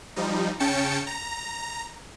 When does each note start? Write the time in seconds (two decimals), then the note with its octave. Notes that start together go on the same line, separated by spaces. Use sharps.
0.16 F3 G3 D#4
0.60 C#3 C#4 G5 A5 C#7
1.07 A#5